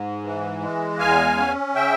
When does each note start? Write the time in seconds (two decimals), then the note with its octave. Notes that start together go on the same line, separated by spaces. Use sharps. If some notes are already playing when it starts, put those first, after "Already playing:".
Already playing: G#2
0.23 E3
0.61 G#3
0.99 E2 F5 G#5
1.37 C#4
1.75 C#3 E5 G5